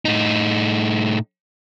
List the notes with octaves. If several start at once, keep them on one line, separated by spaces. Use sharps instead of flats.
A2 D#4